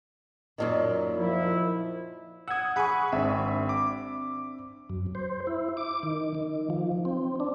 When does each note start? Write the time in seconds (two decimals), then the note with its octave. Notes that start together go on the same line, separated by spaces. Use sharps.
0.58 F#2 A#2 D#3
1.17 F3 E4
2.48 F#5 D#6 E6 G#6
2.76 G#4 F#5 G#5 B5 C#6
3.12 G#1 C4 D4 E5 B5
3.69 D6
4.90 F#2
5.15 C5
5.47 E4
5.77 D6
6.03 D#3
6.35 D#3
6.70 F3
7.05 C4
7.40 D4